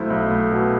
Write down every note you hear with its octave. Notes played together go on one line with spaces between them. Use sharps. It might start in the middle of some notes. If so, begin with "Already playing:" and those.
Already playing: B1 A3 E4 C5
B1
A3
B2